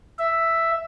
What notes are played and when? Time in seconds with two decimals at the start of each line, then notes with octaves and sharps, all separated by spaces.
0.19 E5